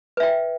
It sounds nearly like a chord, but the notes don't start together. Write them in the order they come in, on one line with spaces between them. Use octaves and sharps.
B4 E5 G5